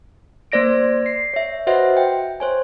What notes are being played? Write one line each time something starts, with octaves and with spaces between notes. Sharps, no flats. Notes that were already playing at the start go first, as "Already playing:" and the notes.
A#3 C5 D5 A#6 D7
C7
C#5 E5
F#4 B4 C5 D#5 E5 F#5
G5
C5 C#5 G#5